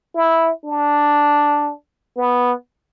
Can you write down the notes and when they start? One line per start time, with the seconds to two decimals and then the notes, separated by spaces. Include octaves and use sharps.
0.15 E4
0.65 D4
2.17 B3